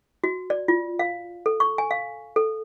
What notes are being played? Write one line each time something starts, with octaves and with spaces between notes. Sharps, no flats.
F#4
D5
F4
F5
A4
C#6
G#5
F5
A4